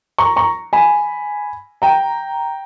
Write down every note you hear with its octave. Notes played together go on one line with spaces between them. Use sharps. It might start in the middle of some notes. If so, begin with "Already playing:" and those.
A#5 C#6
A#5 C#6
G#5 B5
G5 A#5